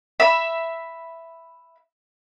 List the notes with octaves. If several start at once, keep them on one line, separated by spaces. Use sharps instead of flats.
E5 B5